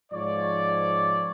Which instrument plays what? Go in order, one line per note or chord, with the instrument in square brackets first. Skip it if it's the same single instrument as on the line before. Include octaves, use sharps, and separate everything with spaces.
[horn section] G#2 F3 C#5 D5